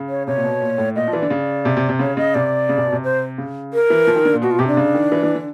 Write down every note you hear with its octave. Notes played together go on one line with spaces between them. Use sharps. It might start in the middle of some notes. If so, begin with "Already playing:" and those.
Already playing: C#3
C#5
C3 C#5
A#2
B2
A#2
A2
A#2 D#5
F3
E3 D5
D3
C#3
C3
C3
C3
C#3 C#5
C#3 D#5
C3 D5
C#3
C3
B2
C3
C5
C#3
A#4
E3
F3
D#3
D3
A#2
B2 F#4
F4
C3 G4
D4
C#3
D#3
E3
E3
D3